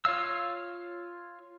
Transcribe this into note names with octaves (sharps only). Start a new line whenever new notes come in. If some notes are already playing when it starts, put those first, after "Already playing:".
F4 C#5 F5 E6